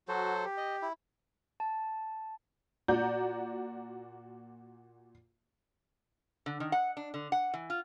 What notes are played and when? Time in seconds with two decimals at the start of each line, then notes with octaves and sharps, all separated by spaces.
0.08 F#3 F#4 A4 C5
0.44 G4
0.58 D#5
0.82 E4
1.60 A5
2.88 A#2 F#4 D5 A#5 G6
6.46 D3
6.60 D#3
6.72 F#5
6.97 D4
7.14 D3
7.32 F#5
7.54 E3
7.70 F4